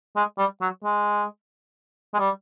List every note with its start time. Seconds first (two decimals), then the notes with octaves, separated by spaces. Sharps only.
0.16 G#3
0.38 G3
0.61 F#3
0.84 G#3
2.14 G#3
2.19 G3